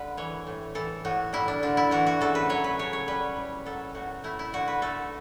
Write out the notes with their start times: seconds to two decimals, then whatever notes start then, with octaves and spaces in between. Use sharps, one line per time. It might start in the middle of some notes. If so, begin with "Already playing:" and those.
Already playing: D3 G3 B4
0.17 E3 C#5
0.47 A2
0.75 E3 A4
1.05 A2 F#4
1.33 G3 E4
1.48 D4
1.63 D3 D4
1.77 E4
1.91 E3 F#4
2.07 F#4
2.21 C#3 A4
2.35 B4
2.49 F#3 C#5
2.64 B4
2.79 C#3 C#5
2.93 C#5
3.08 G3 B4
3.37 A2
3.66 F#3 A4
3.95 A2 F#4
4.24 A3 E4
4.39 E4
4.53 D3 F#4
4.68 B4
4.82 A3 A4